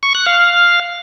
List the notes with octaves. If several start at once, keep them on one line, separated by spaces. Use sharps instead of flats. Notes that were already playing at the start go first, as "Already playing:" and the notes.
C#6
F#6
F5